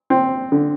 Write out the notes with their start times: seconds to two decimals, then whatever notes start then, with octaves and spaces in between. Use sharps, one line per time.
0.10 C4
0.52 D3